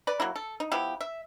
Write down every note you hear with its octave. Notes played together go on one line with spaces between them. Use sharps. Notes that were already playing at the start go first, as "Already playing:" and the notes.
B4 D5
F#3 A#3 E4
A4
D#4
F3 B3 E4 G4
E5